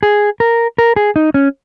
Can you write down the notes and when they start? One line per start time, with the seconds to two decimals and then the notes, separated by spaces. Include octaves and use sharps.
0.03 G#4
0.40 A#4
0.78 A#4
0.96 G#4
1.16 D#4
1.34 C#4